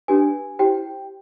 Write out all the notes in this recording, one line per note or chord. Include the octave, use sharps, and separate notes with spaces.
D4 G4 B4 G#5
E4 G4 C5 G5